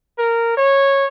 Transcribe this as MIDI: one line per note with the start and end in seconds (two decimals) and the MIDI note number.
0.19 0.56 70
0.57 1.06 73